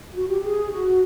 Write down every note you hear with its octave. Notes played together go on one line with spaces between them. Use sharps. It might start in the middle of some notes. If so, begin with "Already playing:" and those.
F#4
G4
G#4
F#4